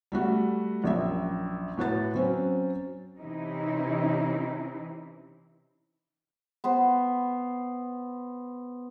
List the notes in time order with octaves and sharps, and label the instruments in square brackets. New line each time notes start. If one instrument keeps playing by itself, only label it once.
[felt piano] G3 A3 F#4
A#1 F#2 E5
A2 F#4 B4 A6
F#3 C4 C#4 C5
[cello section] C3 E3 C4 C#4 D#4 E4
[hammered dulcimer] B3 C5 C6